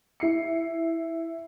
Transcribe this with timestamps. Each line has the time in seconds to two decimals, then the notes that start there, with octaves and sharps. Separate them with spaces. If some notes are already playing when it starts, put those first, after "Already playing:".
0.20 E4 C7 C#7